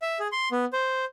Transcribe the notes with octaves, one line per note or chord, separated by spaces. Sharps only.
E5
G#4
C6
B3
C5